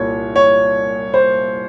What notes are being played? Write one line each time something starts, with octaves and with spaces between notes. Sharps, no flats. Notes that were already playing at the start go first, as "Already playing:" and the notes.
Already playing: C2 A#2 C#5
C#5
C5